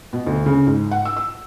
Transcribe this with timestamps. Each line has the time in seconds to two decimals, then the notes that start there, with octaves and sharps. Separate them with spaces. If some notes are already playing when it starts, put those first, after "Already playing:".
0.13 B2
0.27 D2
0.46 C#3
0.67 G#2
0.91 F#5
1.05 E6
1.17 E6